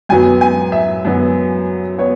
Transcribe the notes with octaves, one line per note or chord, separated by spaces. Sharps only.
F#2 F#3 B3 G#5
G#5
E5
F#2 F#3 B3
B3 C#5